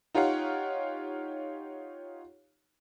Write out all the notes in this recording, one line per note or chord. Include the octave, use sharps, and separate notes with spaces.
D#4 F4 G4 C#5 F5 F#5